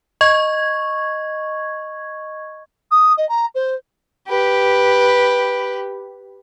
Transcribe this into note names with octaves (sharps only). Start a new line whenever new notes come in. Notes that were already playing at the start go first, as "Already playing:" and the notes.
D#5 C#6 G#6
D#6
D#5
A#5
C5
G4 B4